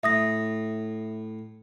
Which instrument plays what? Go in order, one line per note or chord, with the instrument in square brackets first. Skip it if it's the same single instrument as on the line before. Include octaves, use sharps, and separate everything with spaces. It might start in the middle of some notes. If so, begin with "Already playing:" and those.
[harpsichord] A2 [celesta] E5 D#6 A#6